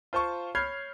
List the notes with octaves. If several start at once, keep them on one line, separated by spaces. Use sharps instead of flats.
F4 C5 A5 C#6
C#5 B5 F6 G6 G#6 C7